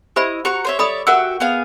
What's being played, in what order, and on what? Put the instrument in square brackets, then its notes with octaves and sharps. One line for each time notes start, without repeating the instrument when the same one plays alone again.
[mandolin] E4 D#5 [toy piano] G4 C5 B5
[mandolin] F#4 A#5 C#6 [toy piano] G4
[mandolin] C5 C#5 E5
[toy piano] A4 B5 D#6 [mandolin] C#5 D5 E5
[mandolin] F#4 G4 E5 [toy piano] A#4 F#5 E6
[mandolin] B3 G#4 F5